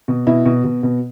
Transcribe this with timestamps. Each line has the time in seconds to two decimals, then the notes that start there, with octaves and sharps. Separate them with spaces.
0.08 B2
0.27 B2 E4
0.45 B2
0.64 B2
0.83 B2